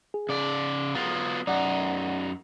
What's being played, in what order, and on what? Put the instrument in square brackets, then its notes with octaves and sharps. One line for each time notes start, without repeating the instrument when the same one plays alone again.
[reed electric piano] G#4
[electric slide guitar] C#3 D5
F#3 B3 F4
[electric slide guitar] F#2 D#4 [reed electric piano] D5 F#5